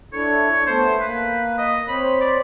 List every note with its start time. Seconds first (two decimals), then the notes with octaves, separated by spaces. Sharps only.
0.13 D4 E4 A4 C#5
0.66 A3 B3 A4 C5
1.00 A#3 B4
1.58 D#5
1.88 C4 C5 C#5 B5
2.21 D5